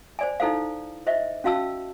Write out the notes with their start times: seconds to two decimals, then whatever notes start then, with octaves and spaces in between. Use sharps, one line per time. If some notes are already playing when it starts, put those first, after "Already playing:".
0.19 C5 D5 G#5
0.40 D#4 E4 A4 C5 F5
1.07 C5 D#5 E5
1.44 C#4 F#4 F5 A5 E6